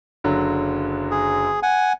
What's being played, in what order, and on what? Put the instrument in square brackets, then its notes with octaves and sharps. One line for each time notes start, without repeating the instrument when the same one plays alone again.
[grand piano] F#1 D3 F#3
[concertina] G#4
F#5 G#5